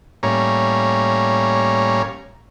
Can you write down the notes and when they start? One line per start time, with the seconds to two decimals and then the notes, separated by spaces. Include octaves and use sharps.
0.23 A2 G3 A#3 C#4 C#5 A#5